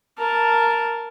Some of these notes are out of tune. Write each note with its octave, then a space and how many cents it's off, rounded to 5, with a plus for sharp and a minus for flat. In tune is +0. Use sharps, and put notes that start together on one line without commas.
A#4 +0 A5 +0